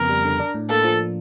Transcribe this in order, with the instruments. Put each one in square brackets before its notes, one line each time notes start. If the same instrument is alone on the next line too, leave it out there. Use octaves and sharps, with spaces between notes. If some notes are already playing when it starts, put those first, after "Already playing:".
Already playing: [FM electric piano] F2 C#3 B3 [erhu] A#4
[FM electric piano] G3
D3
D4
A2
[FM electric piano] A#3 [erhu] A4
[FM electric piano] F3